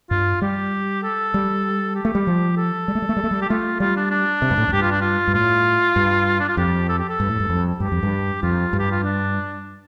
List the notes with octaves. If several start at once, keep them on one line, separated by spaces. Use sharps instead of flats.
G2 F4
G3 G4
A4
G3
G4
A3
G3
F3
A4
G3
A3
G3
A3
G3
A3
G3
G4
A3 F4
G3 F4
D4
D4
C3
G2
A2
F2
G2 G4
F4
D4
F4
G2
A2 F4
G2
D4
F4
F2 G4
A4
G4
A4
G2
A2
G2
F2
G2 G4
F2
G2
F2 F4
G2
G4
F4
D4